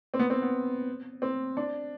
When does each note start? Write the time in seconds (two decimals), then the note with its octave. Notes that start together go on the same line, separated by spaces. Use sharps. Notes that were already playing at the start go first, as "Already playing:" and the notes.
0.14 C4
0.19 B3
0.30 C4
0.42 B3
1.22 C4
1.57 D4